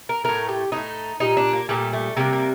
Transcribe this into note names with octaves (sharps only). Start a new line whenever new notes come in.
A#4
A2 A3 A#4
G4
A2 A3 D#4
A#2 G3 D#4
D4
A#3
A#2 G3 A3
A3
C3 G3 A#3
A#3